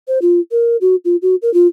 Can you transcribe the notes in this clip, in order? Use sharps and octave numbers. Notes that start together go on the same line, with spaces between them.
C5
F4
A#4
F#4
F4
F#4
A#4
F4